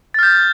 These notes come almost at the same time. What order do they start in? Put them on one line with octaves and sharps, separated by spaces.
A6 F6 G6